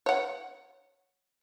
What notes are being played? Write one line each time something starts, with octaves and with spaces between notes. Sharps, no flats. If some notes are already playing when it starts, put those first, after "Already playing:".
C#5 F#5